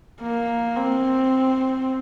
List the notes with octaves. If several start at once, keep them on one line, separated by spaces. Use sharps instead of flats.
A#3
C4